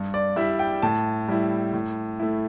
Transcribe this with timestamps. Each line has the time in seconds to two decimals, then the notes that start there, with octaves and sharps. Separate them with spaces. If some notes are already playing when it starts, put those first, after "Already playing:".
Already playing: G2
0.14 D5
0.36 G3 E4 E5
0.59 G5
0.82 A2 A5
1.28 G3 E4
1.73 A2
2.20 A3 E4